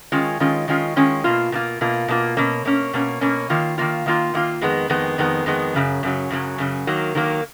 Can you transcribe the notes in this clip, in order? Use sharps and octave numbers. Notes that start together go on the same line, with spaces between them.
D#3 G#3 C#4 F4
D#3 G#3 C#4 F4
D#3 G#3 C#4 F4
D#3 G#3 C#4 F4
B2 A#3 F4
B2 A#3 F4
B2 A#3 F4
B2 A#3 F4
B2 A#3 C#4
B2 A#3 C#4
B2 A#3 C#4
B2 A#3 C#4
D#3 A#3 F4
D#3 A#3 F4
D#3 A#3 F4
D#3 A#3 F4
F2 D#3 G#3 B3
F2 D#3 G#3 B3
F2 D#3 G#3 B3
F2 D#3 G#3 B3
F#2 C#3 F#3
F#2 C#3 F#3
F#2 C#3 F#3
F#2 C#3 F#3
D#3 F#3 A#3
D#3 F#3 A#3